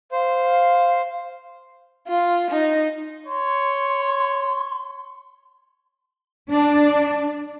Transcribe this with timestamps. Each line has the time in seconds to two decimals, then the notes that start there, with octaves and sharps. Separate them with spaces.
0.12 C5 F5
2.08 F4
2.51 D#4
3.26 C#5 C6
6.50 D4